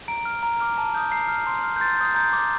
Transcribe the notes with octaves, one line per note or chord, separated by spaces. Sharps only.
A#5 D7
F6
A#5
D6 F6
A5
D#6 G6
A#5 C7
F6
C6
F6
G6
C6 A6
D#6 G6
A#5 G6
D6 G6